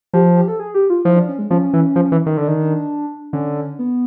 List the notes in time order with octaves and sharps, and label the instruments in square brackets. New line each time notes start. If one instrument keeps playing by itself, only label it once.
[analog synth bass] F3 [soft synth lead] G4
[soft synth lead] G4
A4
G#4
G4
F4
[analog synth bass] F3 [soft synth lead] E4
[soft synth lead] D4
C#4
G#3
[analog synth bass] F3 [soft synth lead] C#4
[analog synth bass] E3
F3
E3
D#3
[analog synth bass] D3 [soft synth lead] D4
[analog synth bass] D#3
[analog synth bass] D3 [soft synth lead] C#4
[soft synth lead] B3